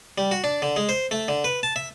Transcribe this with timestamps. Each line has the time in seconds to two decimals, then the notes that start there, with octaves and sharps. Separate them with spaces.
0.18 G3
0.31 F#4
0.44 D4
0.62 D3
0.76 G#3
0.89 C5
1.11 A3
1.28 D3
1.44 B4
1.63 A5
1.76 E5